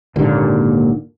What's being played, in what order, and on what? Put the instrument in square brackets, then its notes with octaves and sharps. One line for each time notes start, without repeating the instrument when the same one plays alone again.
[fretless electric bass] G#1 D#2 A#2 D3